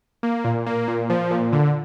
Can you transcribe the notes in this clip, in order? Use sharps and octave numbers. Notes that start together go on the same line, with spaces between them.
A#3
A#2
A#3
A#2
F3
A#2
D3